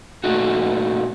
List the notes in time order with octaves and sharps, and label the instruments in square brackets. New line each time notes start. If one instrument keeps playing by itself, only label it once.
[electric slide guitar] A#2 A3 D#4 F#4